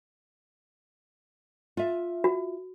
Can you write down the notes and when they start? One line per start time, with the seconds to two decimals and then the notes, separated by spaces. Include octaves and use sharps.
1.77 F4 E5
2.24 F#4